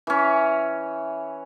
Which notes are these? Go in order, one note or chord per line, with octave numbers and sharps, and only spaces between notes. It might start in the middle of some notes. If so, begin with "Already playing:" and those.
E3 C#4